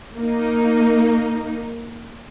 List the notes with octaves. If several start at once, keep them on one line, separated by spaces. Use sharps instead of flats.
A#3 D#4